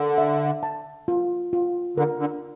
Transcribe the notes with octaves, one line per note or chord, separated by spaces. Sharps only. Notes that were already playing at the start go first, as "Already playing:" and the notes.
Already playing: D3 A#4
E5
A5
F4
F4
D3 A#4
D3